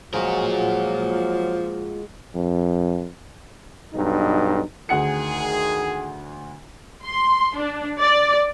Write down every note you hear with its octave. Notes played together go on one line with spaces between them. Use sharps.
F3 F#3 G#3 F4 F#4 A#4
F2
B1 G2 D#4
D2 D#3 G#4 F#5 C#7
C6
D4
D5